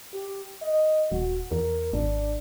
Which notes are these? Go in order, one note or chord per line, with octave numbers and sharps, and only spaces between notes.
G4
D#5
D#1 F#4
E2 A#4
G#1 D4